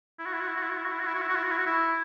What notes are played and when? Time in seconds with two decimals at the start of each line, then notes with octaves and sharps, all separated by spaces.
0.19 E4
0.26 F#4
0.33 E4
0.41 F#4
0.47 E4
0.56 F#4
0.63 E4
0.70 F#4
0.78 E4
0.85 F#4
0.92 E4
1.00 F#4
1.06 E4
1.15 F#4
1.22 E4
1.28 F#4
1.36 E4
1.43 F#4
1.51 E4
1.58 F#4
1.66 E4